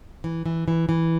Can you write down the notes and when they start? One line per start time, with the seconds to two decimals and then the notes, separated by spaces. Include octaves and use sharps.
0.24 E3
0.46 E3
0.68 E3
0.89 E3